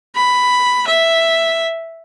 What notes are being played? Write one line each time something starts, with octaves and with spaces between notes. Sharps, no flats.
B5
E5